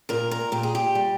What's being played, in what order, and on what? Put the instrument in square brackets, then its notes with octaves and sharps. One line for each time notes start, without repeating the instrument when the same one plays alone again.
[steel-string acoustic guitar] A#2 A#4
A#4
A#2 G4
G#4
G4
G3